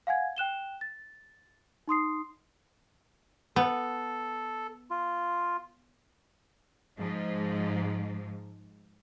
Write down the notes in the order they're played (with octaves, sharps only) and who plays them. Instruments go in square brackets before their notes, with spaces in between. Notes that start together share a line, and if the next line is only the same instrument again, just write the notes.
[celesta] F5 F#5 G#5 G#6
G5 F#6 E7 G7
A6
D#4 C6 D#6 C7
[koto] B3 [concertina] A4
[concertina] F4
[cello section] G#2 F3